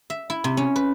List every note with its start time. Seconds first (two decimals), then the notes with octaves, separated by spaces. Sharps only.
0.10 E5
0.30 E4
0.44 C3
0.57 C#4
0.76 B4